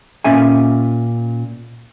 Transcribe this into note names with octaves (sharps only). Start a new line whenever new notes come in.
A#2 C#4 E5 G#5